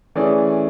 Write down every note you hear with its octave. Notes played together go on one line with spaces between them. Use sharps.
E3 A3 C#4 G#4 D5